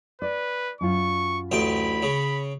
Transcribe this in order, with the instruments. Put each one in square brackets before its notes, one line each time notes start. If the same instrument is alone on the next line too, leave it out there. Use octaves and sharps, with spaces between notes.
[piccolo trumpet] B4 [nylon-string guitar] D5
[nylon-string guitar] F#2 F4 [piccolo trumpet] C#6
[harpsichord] A1 D2 G5 [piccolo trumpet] B5
[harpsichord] C#3